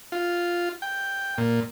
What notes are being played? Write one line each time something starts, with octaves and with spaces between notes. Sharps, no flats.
F4
G5
A#2